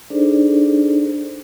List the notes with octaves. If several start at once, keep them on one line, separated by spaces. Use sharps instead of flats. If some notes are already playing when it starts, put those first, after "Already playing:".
D4 D#4 G#4 A4 C5 D5